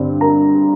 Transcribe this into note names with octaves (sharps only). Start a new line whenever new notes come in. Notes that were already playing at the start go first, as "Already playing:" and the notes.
Already playing: G2 D3 C4
A#4 A#5